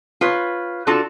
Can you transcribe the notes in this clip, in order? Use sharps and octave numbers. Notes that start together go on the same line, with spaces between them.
F4 B4 C#5
D4 F4 F#4 A4